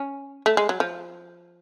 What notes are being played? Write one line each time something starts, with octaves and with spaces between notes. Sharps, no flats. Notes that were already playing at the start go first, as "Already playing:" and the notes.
Already playing: C#4
A3
G#3
F#3
F3